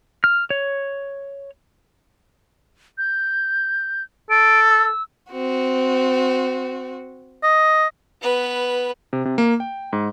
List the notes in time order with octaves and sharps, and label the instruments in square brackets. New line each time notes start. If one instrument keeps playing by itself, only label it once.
[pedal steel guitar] F6
C#5
[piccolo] G6
[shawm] A4 [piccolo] D7
[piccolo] E6
[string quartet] C4 F#4
[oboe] D#5
[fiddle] B3 B4
[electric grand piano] C3
C3
A#3
G5
G#2